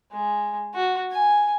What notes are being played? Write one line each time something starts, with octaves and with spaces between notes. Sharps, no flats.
G#3
F#4
G#5